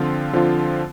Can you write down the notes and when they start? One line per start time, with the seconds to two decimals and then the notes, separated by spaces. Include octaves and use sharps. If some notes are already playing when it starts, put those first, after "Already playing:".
Already playing: D3 F3 C4 F4
0.33 D3 F3 C4 F4